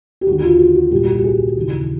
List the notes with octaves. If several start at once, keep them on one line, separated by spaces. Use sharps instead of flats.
G4
D#2 D3 F#4
F4
F#4
F#4
C2 A#2 G4
F#4
G4
G#4
D#2 C#3 E3